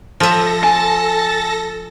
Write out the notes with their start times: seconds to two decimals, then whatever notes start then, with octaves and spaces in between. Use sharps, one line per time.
0.20 F3 A4 E5 A#6
0.64 G#5 A5